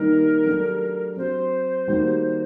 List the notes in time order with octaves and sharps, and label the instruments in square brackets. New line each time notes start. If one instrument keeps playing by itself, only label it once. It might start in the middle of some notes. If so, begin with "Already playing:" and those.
Already playing: [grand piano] D#3 G3 A#3 D#4 [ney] A#4
[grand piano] F#3 A3 D4 G4
[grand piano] F#3 C4 F#4 [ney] C5
[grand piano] D#3 G3 A#3 F#4